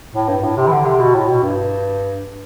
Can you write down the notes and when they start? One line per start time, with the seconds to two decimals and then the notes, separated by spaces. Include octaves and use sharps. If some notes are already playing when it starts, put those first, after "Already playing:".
0.15 A2
0.29 G2
0.44 A2
0.57 C3
0.67 E3
0.72 D3
0.85 C3
0.99 B2
1.14 A2
1.28 B2
1.43 G2